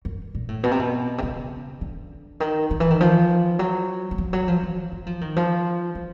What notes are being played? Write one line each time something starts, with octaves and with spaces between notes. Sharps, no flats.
F#2
A#2
A2
B2
C3
B2
C3
C#3
D3
D#3
D#3
E3
D#3
F3
F#3
F#3
F3
F#3
F3
E3
F#3
F3
D#3
F3
F3